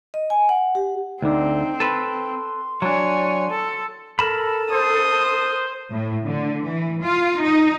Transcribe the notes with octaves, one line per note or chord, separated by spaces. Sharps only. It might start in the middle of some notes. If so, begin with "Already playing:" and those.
D#5
G#5
F#5
G4
D2 D3 C4 D#4
A4 B4 C6
F#3 D4 C#5 G#5
A4
A4 A#4 A5 B5
C5 D#6
A2
D3
E3
F4
D#4